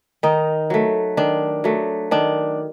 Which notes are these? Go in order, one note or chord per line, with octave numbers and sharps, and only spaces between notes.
D#3 D#4
F#3 A3
D#3 D4
F#3 A3
D#3 D4